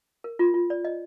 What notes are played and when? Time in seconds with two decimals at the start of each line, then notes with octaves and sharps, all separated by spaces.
0.24 A#4
0.39 F4
0.54 F4
0.70 D5
0.85 D#5